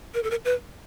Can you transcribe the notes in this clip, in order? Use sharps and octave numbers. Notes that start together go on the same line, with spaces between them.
A#4
A4
A#4
B4